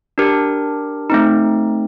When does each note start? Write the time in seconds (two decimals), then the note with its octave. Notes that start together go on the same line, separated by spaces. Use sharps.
0.18 D4 G4 A#4
1.10 A3 C4 D#4